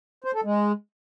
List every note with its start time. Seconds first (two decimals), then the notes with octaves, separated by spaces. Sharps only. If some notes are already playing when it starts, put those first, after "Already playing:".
0.24 C5
0.34 A4
0.44 G#3